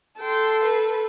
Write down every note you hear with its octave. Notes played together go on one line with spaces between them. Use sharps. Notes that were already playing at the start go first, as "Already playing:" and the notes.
A4 G5 C6
B4